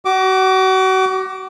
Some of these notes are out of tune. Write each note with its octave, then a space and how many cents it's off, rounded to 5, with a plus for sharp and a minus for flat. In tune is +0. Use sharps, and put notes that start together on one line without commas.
F#4 +30 D6 +0